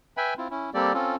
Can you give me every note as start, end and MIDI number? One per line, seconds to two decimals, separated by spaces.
0.17 0.34 71
0.17 0.34 76
0.17 0.34 79
0.17 0.34 80
0.17 0.34 83
0.38 0.48 60
0.38 0.48 64
0.38 0.48 65
0.51 0.70 61
0.51 0.70 64
0.74 0.93 55
0.74 0.93 58
0.74 0.93 60
0.74 0.93 67
0.74 0.93 69
0.74 0.93 74
0.94 1.16 60
0.94 1.16 61
0.94 1.16 65
0.94 1.16 69